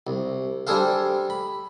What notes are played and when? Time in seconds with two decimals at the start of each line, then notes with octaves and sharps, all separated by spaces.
0.07 C2
0.67 G3 D4 G#4 A4 C5 F5
1.30 B5